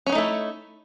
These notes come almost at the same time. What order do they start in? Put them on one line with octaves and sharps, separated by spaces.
C#4 B3 D#4 A3 E4